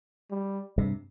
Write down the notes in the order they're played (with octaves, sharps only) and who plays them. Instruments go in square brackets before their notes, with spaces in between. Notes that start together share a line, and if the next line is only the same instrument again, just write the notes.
[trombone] G3
[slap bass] G2 C3